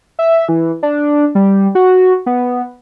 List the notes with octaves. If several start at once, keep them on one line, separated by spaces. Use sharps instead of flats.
E5
E3
D4
G3
F#4
B3